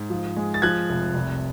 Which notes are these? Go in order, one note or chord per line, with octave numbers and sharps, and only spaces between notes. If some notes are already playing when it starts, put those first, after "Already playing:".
Already playing: G#2
F3
G#3
A6
F3 F#6 G#6
F1
C2